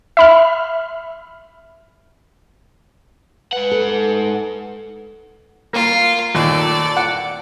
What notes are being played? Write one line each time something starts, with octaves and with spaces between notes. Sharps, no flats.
E5 B5 F6
G#2 B4 F#5
A4
A#3 F4
D#2 A#2 A4 D5
F#5